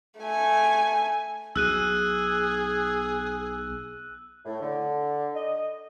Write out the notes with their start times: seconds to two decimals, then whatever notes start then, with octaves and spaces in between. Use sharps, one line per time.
0.20 A3 G#5
1.56 B1 G#4 E6 F#6 D#7
4.45 A2
4.61 D3
5.34 D#5